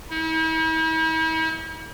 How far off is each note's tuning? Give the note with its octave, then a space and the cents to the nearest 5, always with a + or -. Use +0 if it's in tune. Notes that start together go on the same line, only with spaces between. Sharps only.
E4 -45